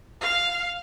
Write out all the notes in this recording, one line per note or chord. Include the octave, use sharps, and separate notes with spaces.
F5